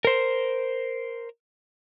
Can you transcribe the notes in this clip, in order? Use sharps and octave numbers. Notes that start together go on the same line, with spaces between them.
A#4 C5